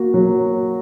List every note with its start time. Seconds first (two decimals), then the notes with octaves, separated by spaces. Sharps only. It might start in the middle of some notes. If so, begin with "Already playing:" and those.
Already playing: A#3 F#4
0.14 F#3